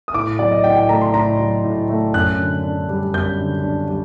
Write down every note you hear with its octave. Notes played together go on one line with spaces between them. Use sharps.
D#6
A2 D6
F#3 D5
D#5
A2 G5
G5
A3 A#5
C6
A2 A#5
F#3
A2
A3
F#2 F#6
D3
D4
G3
F#2 G6
D3
D4
G3